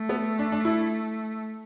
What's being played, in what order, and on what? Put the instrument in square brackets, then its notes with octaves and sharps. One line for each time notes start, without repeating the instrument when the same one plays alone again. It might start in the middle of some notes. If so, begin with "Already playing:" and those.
Already playing: [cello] A3
[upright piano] B3
D4
D4
E4